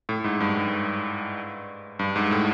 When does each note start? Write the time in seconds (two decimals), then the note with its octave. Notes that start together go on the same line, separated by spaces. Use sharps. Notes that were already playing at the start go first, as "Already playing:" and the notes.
0.09 A2
0.24 G#2
0.40 G2
0.57 G2
1.99 G2
2.16 G#2
2.31 A2